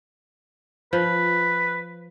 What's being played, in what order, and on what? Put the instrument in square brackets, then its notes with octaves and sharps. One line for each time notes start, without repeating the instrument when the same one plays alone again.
[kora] F3 [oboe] B4